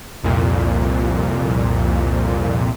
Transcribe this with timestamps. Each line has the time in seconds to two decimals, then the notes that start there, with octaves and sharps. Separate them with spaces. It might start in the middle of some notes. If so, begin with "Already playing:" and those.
0.24 C2 F2 A#2